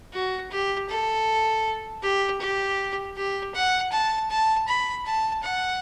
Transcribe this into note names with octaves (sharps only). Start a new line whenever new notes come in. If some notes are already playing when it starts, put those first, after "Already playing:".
F#4
G4
A4
G4
G4
G4
F#5
A5
A5
B5
A5
F#5